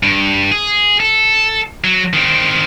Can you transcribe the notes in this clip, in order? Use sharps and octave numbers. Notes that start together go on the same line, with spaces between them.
G2
G#4
A4
F#3
D#3 C4